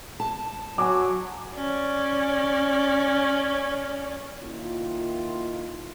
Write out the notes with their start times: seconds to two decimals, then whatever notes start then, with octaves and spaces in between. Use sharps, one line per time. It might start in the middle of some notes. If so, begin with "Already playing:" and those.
0.20 A5
0.78 F#3 G#5 D6
1.55 C#4 D5
4.44 D#3 A#3 E4 F4